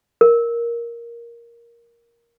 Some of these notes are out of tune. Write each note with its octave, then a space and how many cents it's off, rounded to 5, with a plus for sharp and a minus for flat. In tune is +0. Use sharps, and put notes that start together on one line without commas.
A#4 +10